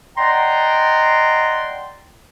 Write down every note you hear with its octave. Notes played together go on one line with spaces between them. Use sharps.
D5 D#5 F#5 G5 A#5 C6